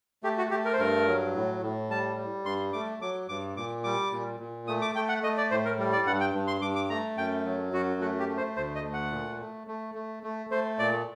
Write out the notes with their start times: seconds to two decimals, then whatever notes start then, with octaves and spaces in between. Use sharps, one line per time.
0.23 A3 G4
0.38 F#4
0.51 A3 G4
0.65 A#4
0.73 C5
0.79 G2 A#4
1.07 F#3
1.35 A2
1.62 A2
1.90 G3 A5
2.17 G3
2.45 G2 C6
2.73 A3 D6
3.02 F#3 D6
3.29 G2 D6
3.57 A#2 D6
3.84 G3 D6
4.12 A#2
4.40 A#2
4.67 A3 D#6
4.82 D6
4.95 A3 G5
5.09 F#5
5.23 A3 D#5
5.37 D5
5.51 A2 C5
5.65 A#4
5.79 G3
5.92 D5
6.06 G2 F#5
6.21 G5
6.34 G2
6.48 C6
6.62 G2 D6
6.75 D6
6.90 A3 A#5
7.18 F#2 G5
7.45 F#3
7.73 F#2 F#4
8.01 A3 F#4
8.19 G4
8.29 A3
8.37 C5
8.56 D2 C5
8.75 D#5
8.84 A3
8.93 F#5
9.12 A#2
9.40 A3
9.67 A3
9.95 A3
10.23 A3
10.50 A3 C5
10.79 A#2 D5